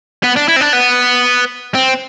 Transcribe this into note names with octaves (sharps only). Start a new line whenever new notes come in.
B3
D4
E4
C4
D4
B3
C4